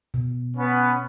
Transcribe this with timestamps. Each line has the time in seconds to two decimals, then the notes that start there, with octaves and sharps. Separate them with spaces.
0.14 B2
0.56 B3 C#4 B4